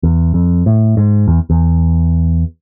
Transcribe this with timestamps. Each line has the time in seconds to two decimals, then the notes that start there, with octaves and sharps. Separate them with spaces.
0.03 E2
0.34 F2
0.66 A2
0.97 G#2
1.28 E2
1.50 E2